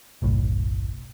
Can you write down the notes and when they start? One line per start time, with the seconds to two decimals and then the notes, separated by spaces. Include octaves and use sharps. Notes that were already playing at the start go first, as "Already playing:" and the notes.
0.22 F#1 B1 A2